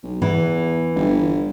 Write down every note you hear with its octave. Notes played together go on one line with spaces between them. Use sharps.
B1
E2 E3
G1